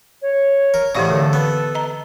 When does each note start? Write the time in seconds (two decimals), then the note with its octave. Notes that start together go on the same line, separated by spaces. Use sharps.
0.21 C#5
0.74 A#4
0.95 A2 C#3 E3 G4 D5 F#5
1.10 D3 A4
1.33 B3
1.75 D#5 A#5